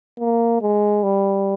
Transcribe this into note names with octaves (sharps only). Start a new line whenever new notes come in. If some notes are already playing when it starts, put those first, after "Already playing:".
A#3
G#3
G3